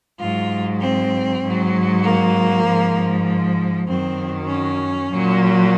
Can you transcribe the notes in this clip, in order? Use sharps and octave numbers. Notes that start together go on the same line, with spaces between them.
G#2 F#3 F4
C4
G#2 F#3
A#3
G#2 F3
F#2 D#3 F#3 C4
C#4
A#2 F#3